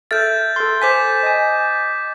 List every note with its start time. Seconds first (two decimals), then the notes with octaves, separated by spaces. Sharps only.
0.11 A4 E5 F6 G6 A6
0.56 A4 C6
0.82 C5 G#5 D6 G6 B6
1.23 D#5 G#5